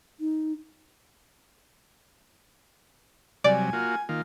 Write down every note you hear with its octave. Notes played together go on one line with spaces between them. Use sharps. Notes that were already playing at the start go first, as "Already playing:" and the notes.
D#4
C3 F#3 G3 D5 G#5
A#3 F4 F#4
D#3 A#3 F4